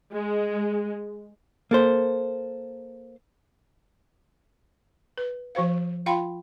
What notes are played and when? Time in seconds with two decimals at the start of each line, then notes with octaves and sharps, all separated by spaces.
0.13 G#3
1.71 A#3 A4 C5
5.18 B4
5.55 F3 F#4 C5 F5
6.06 F4 F5 G5 B5 C6